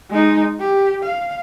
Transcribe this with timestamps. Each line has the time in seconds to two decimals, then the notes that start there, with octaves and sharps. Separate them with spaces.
0.10 G#3 D#4
0.60 G4
1.04 F5